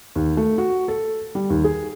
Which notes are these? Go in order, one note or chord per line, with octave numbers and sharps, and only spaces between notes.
D#2
A3
F#4
A4
G3
D#2
G#4